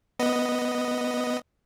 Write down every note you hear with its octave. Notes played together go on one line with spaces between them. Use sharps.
B3 D#5